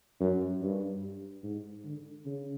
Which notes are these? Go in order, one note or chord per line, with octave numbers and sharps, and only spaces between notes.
F#2
G2
G#2
D3
C#3